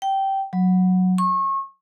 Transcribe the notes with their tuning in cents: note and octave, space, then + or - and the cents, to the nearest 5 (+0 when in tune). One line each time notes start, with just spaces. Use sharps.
G5 -15
F#3 -10
C#6 -30